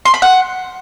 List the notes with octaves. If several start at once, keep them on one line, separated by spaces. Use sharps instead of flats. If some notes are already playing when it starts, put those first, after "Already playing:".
C6
B5
F#5